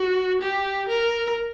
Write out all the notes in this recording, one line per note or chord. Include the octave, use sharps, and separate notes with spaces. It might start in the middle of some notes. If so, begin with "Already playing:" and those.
Already playing: F#4
G4
A#4